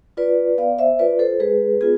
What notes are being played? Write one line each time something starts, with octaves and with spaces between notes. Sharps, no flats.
F4 B4 D5
B3 D5 F5
C5 E5
F4 B4 D5
A4 C5
G#3 G#4 B4
B3 F4 G#4